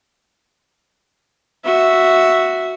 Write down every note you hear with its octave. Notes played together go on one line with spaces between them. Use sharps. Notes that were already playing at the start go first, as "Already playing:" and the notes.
F#4 E5